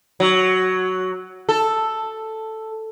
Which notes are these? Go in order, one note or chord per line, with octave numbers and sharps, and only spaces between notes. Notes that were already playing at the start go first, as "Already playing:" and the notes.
F#3
A4